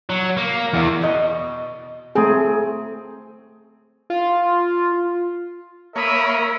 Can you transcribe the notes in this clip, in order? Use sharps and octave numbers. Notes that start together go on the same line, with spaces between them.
F#3
A#3
E2
B2 D#5
A3 C4 G#4
F4
A#3 A#4 C#5 E5 B5 D#6